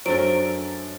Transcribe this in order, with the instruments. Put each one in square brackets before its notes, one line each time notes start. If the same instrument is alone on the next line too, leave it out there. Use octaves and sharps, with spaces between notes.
[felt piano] F#2 D4 A6 [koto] F#3 A3 A#4 [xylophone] C5 D7